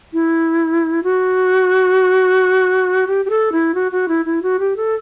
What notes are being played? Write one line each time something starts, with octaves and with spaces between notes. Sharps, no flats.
E4
F#4
G4
G4
A4
E4
F#4
F#4
E4
E4
F#4
G4
A4